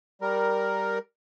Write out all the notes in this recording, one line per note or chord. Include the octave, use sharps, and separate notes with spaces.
G3 A#4